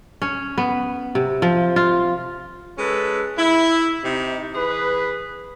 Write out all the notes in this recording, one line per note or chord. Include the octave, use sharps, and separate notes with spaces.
C#4
B3
C3
F3
F4
G#3 C#4 A4 B4
E4
C3 D#4
E3 G#4 B4